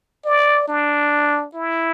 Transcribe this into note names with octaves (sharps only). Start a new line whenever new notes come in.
D5
D4
E4